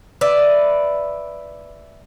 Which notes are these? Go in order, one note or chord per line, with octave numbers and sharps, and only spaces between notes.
B4 D5 E5